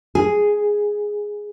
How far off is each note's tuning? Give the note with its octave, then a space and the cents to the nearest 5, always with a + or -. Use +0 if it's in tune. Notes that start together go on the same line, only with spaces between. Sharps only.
G#4 +0